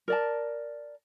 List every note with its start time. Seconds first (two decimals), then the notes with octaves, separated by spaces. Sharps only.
0.08 A#4 D5 A5